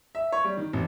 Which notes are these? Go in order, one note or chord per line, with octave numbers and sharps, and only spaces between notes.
E5
C#5
G3
D#3
A1